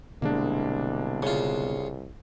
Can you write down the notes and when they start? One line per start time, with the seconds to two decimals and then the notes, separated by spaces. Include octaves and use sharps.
0.22 C2 B2 D3 G#3 A#3 D4
1.23 C#3 F4